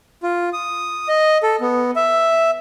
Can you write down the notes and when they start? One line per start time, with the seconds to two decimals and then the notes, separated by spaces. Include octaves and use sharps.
0.23 F4
0.53 D#6
1.08 D#5
1.43 A4
1.61 B3
1.96 E5